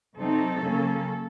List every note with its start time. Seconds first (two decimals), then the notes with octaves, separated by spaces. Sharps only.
0.18 C3 F#3 C4 D#4 A4
0.63 C#3 F#3 A#3 C#4